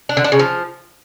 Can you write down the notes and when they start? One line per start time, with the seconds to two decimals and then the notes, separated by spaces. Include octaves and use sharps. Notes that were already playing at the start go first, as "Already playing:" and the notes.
0.09 D4
0.17 D3
0.24 D4
0.32 C#3
0.39 F3